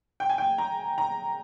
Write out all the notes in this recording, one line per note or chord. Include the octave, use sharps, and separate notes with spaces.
G5
G#5
G5
A#5
A#5